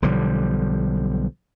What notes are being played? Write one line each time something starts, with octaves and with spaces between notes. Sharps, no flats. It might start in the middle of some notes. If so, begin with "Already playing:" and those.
B1 D3 F3 G3